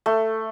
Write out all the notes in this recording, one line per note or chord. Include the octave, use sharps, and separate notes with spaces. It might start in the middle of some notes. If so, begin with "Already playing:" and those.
A3